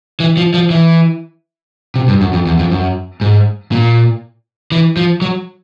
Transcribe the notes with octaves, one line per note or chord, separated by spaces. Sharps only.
E3
F3
F3
E3
C3
G2
F#2
F2
E2
F2
F#2
G#2
A#2
E3
F3
F#3